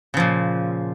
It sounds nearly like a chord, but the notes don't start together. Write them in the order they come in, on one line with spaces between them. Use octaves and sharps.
C#3 F3 A#2